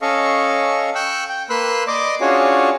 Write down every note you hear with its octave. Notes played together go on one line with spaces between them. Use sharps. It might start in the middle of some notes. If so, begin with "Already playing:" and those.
C#4 A4 D#5 F5 C#6
G5 C#6 E6 F#6
G5
A#3 B4 C6 E6 F#6
D5 D#5 C6 D6
C#4 D4 F4 F#4 G#4 C#5